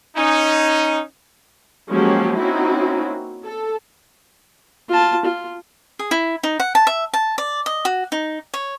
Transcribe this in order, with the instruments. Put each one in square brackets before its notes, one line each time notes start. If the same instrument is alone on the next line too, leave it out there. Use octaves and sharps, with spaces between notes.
[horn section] C#4 D#4
[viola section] F3 F#3 G#3 A#3 C#4 G4
A#3 C4 C#4 D#4 E4 F#4
A4
[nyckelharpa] F4 A5
F4
[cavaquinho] G#4
E4
D#4
F#5
A5
E5
A5
D5
D#5
F#4
D#4
C#5